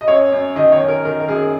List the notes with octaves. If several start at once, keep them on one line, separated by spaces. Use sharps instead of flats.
D#5
F#2 C#5
F#2
D#3 D#5
C#5
F#2
A#4
D#3 A#4
A#4
F#2 G#4